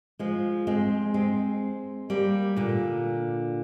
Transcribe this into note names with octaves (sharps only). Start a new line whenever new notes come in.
F3 G#3
G#3 C4
G#3 C4
G3 A#3
A#2 D3